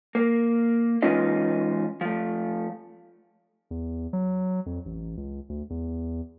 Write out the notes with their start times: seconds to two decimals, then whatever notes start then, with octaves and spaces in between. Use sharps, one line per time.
0.15 A#3
1.02 E3 G#3 C#4 D#4 F4 D#5
2.01 F3 A3
3.71 E2
4.13 F#3
4.66 F2
4.85 A1
5.17 C#2
5.49 D2
5.70 E2